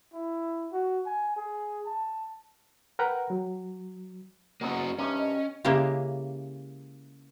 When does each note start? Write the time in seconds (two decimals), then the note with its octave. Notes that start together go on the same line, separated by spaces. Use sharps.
0.14 E4
0.73 F#4
1.06 G#5
1.37 G#4
1.86 A5
2.99 A#4 B4 F#5 G5 A#5
3.30 F#3
4.61 F#3 G#3 A#3 B3 C#4 F#4
4.99 G2 C3 D#3 C#4
5.19 D#5
5.65 C#3 G#3 A#3 C#4 E4 G4